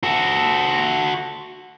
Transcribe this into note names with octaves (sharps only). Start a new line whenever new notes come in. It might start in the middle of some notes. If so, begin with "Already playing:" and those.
F#4 A4